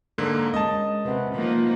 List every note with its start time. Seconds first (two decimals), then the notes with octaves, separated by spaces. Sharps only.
0.18 G#2 D3 A#3 A#4
0.54 G#3 C#4 D#5 A5
1.06 C3 B4 F#5
1.35 F3 A#3 D#4